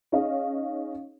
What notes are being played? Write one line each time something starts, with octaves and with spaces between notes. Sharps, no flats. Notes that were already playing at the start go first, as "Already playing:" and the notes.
C#4 D#4 G#4 C#5 D#5 F5